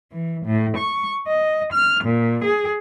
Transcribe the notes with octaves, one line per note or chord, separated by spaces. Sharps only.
E3
A2
C#6
D#5
F6
A#2
G#4